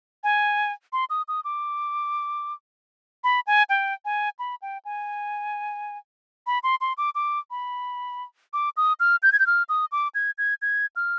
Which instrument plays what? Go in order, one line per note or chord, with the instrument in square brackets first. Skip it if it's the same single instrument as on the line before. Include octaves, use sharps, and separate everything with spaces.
[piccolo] G#5
C6
D#6
D#6
D6
B5
G#5
G5
G#5
B5
G5
G#5
B5
C6
C6
D6
D6
B5
D6
D#6
F6
G6
G#6
G6
F6
D#6
D6
G#6
G#6
G#6
F6